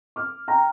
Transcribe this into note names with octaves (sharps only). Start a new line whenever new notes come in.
D6 F6
G5 A#5